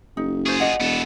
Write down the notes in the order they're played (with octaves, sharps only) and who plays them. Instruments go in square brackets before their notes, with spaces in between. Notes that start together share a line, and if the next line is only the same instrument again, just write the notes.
[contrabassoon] F#1 [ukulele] D#4
[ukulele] C#4 C5 [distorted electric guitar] F4 G#4
[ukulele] D5 D#5 F#5
[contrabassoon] E1 [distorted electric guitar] B3 A4